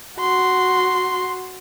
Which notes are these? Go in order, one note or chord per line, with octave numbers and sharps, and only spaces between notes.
F#4 C6